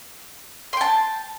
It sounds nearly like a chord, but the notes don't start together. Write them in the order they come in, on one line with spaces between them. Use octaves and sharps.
C6 G5 A5